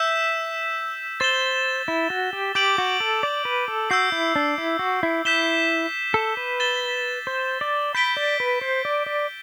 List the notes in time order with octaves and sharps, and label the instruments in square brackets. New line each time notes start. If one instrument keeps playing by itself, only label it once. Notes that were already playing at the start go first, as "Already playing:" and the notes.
Already playing: [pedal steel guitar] E5 [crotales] E6 G6 B6 E7
[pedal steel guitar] C5 [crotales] A6 E7 G7
[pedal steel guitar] E4
F#4
G4
[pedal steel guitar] G4 [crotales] D6 G6 D7 F#7
[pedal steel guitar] F#4
A4
D5
B4
A4
[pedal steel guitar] F#4 [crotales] E6 G6 C7
[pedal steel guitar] E4
D4
E4
F#4
E4
[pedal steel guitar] E4 [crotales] G6 B6 E7 G7
[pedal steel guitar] A4
B4
[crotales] A6 E7 G7
[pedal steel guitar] C5
D5
[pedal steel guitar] B5 [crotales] G6 B6 D7 G7
[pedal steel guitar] D5
B4
C5
D5
D5